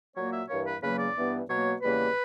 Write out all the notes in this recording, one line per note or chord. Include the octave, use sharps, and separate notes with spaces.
A#2 F#3 A#3 C#5
E5
G2 E3 A#3 C#5
B4
E2 C#3 F#3 A#3 B4
D5
G2 E3 B3
B2 F#3 A#3 C#5
E2 C#3 G3 A#3 B4